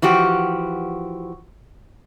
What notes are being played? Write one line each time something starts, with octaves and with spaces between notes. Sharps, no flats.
E3 F3 F#4 G4